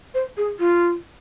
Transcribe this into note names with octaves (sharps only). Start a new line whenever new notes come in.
C5
G#4
F4